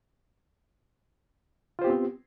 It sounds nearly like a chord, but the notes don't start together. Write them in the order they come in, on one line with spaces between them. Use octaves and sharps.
F4 C5 G4 B3 C4